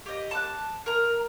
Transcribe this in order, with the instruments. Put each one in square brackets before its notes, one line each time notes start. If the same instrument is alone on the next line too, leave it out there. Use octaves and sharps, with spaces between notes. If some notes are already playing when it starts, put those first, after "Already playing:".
[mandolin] G4 D#5
A5 D6 F#6
A#4 A#5